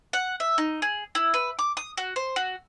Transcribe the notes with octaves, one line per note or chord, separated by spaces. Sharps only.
F#5
E5
D#4
G#4
E4
B4
D6
D#6
F#4
C5
F#4